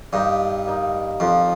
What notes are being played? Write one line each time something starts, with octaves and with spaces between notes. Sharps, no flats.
G2 G3 A#3 D#4
G3 A#3 D#4
F2 F3 A#3 F4